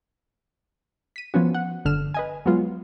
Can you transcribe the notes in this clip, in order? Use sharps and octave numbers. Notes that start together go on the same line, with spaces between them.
B6 D#7
F3 B3 C#4 F#4
F#5
G1 D3 F6 E7
B4 D#5 G#5
F#3 G#3 B3 F4